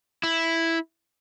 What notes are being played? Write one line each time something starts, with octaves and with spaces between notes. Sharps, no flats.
E4